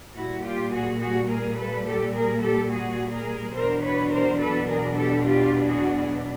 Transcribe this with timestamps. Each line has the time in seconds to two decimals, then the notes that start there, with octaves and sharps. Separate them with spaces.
0.14 A#2 G3 A#3 E4 F#4
0.43 F4 G4
0.71 F#4 G#4
1.00 F#4 G#4
1.28 G#4 A#4
1.56 A4 B4
1.85 G4 A4
2.13 G#4 A#4
2.41 G4 A4
2.69 F#4 G#4
3.12 G#4 A#4
3.54 E2 B2 F#3 B3 D4 A#4 C5
3.82 B4 C#5
4.11 A#4 C5
4.39 A4 B4
4.67 G#4 A#4
4.95 G4 A4
5.24 F4 G4
5.66 F#4 G#4